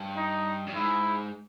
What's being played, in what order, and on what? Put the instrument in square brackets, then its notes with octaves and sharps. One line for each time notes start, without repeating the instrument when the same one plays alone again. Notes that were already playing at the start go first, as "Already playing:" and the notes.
Already playing: [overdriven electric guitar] G2
[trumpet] D#4
[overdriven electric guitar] G2
[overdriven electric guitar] G#2 [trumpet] E4